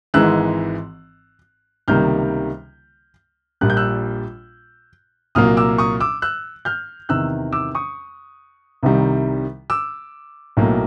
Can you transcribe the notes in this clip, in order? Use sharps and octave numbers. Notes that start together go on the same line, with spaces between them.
G#1 G#2 E3 G#3 E6 F#6
C#2 C3 D#3 G3 A#3 F6 G6
A#1 A#2 G3 A#3 F#6
G6
E6 F#6
C2 A#2 F#3 A#3 D#6 F6
D6 E6
C#6 D#6
D6 E6
E6 F#6
F6 G6
E2 C3 D#3 E6 F#6
D6 E6
C#6 D#6
C2 C3 D#3 G3
D6 E6
B1 A2 F#3 A#3